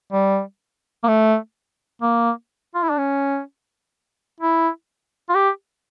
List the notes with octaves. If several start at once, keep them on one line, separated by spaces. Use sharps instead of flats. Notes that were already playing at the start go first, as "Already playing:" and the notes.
G3
A#3
A3
A#3
F4
E4
D4
C#4
E4
F4
G4